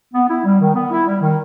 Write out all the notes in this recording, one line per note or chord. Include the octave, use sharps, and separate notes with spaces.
B3
E4
G3
D#3
B3
E4
G3
D#3